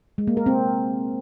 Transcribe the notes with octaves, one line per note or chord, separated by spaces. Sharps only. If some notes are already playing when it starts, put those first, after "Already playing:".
G#3
A#3
A#4
C4